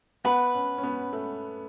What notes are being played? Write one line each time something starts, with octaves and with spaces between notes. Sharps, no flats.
B3 B4 F#5 B5
C#4
C#4
B3
A3